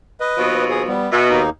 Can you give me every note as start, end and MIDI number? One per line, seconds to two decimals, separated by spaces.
0.20 0.65 71
0.20 0.65 75
0.37 0.95 39
0.37 0.95 47
0.37 0.95 53
0.70 0.83 68
0.88 1.11 55
0.88 1.11 59
1.11 1.41 47
1.11 1.27 76
1.29 1.50 39
1.29 1.50 58
1.29 1.50 63